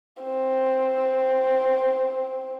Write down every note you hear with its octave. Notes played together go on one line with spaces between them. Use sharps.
C4